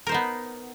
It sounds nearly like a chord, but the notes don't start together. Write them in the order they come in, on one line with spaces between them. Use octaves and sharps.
A#4 C5 D#4 B3